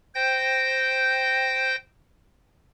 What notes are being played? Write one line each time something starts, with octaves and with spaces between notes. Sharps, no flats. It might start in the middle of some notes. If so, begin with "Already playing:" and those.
C5 G5 G6 A#6